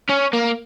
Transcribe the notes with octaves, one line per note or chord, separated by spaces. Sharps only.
C#4
A#3